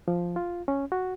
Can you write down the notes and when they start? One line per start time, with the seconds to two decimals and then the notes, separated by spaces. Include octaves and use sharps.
0.08 F3
0.36 F4
0.68 C#4
0.92 F#4